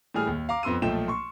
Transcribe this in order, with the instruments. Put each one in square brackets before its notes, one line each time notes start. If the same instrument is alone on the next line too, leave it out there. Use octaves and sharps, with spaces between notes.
[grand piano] A2 E3 G3 G#4 G#5 F6
D#2
F5 A#5 D6
F2 B3 C6 E6 D#7
B1 A#2 F3 A3 G5 E7
C6 C#6